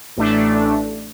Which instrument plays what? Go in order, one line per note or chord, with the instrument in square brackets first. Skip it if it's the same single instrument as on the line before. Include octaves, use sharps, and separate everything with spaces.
[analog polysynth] A1 A3 D4